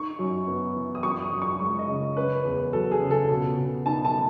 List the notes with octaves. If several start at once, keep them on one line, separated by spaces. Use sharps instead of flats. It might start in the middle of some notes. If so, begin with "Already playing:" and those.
Already playing: D#4 C#6
F#2
B3
E3
D#6
F#2 C#6
D#6
F#2
C#6
G#3 C#6
D#5
C#3
C#4 B4
E2
F#3 A4
G#4
C#3
A4
B2
B2
D#4 A5
A5
A3